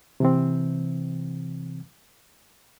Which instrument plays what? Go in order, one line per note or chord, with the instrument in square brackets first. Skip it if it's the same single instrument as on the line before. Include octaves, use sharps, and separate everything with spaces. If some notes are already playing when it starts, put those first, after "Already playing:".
[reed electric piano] C3 E3 C4